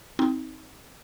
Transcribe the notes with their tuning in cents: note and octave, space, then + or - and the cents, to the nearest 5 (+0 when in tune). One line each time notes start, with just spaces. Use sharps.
C4 +0 D#4 +25